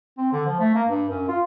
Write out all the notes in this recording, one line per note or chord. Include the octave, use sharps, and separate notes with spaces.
C4
D3
F3
A3
A#3
G2
F#2
F4